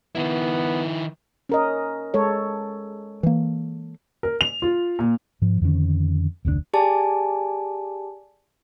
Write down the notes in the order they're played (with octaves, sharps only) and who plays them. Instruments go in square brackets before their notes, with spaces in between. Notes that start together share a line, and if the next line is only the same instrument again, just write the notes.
[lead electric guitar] D#3 E4 [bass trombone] B3
[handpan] C#4 A#4 D#5
G#3 A4 C#5
[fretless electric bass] E3 A#3
[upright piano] A#4
F7
F4
A#2
[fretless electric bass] G#2 F3
F2 D3 D#3 C#4
F1 D2 A2 D4
[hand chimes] G4 G#4 D5 G#5 A5